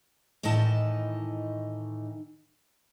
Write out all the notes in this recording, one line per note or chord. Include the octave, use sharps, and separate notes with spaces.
A2 D#3 E3 D#4 D#5 A5